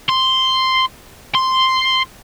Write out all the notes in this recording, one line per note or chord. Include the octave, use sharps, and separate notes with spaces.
C6
C6